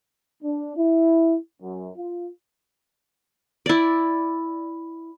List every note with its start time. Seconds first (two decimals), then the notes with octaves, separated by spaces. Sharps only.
0.43 D4
0.77 E4
1.62 F#2
1.97 F4
3.66 E4 D5